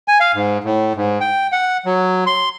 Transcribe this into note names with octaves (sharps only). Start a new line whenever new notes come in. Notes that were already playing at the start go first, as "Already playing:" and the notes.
G#5
F5
G#2
A2
G#2
G5
F#5
F#3
C6